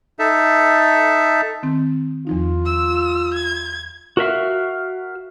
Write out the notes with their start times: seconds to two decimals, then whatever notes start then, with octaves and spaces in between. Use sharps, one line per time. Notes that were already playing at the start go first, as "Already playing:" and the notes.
0.19 D#4 A4 E5
1.63 D#3 C4
2.27 E2 F3 D#4 F4
2.66 E6
3.34 G#6
4.17 F#4 A#4 E5 F5